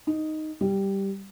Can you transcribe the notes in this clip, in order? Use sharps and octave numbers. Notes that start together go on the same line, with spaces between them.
D#4
G3